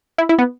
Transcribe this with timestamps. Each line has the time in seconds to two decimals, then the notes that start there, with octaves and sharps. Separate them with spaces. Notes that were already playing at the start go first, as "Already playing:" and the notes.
0.18 E4
0.29 E4
0.39 B3